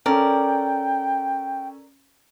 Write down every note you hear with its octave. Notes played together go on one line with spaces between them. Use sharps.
C#4 A4 A#4 D5 G5